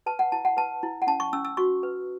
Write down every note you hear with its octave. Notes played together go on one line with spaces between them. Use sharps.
B4 A5
F#5
E4 A5
F#5
B4 A5
E4
F#5
C#4 A5
C#6
C#4 E6
E6
F#4 C#6
B4